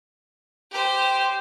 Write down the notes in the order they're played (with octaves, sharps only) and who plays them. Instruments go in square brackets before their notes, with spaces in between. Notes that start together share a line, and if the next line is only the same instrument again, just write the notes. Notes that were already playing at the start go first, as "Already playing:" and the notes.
[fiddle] G4 C5